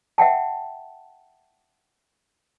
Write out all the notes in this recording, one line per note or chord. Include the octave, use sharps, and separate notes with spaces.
E5 F#5 G5 A5